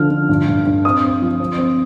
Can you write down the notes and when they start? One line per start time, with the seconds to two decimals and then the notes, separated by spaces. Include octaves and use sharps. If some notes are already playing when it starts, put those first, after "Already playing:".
Already playing: D3 F3 F6
0.11 D3
0.29 G2
0.48 G2
0.66 G2
0.85 C4 D#6
1.03 C4
1.22 F3
1.40 C4
1.59 C4